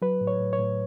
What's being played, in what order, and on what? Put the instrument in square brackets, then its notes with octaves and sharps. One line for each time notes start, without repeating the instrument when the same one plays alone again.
[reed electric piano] F#3 B4
A2
C#5
A2
C#5
A2